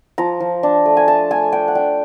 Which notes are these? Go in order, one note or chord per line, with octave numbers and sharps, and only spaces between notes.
F3 A#5
F3
D4
A3
G#5
A3 A5
A3 G#5
D4 G5
F#5
D4 G5